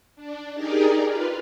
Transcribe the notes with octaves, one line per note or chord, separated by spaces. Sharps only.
D4
D#4 G4 G#4 A#4 D5
F4 B4 F5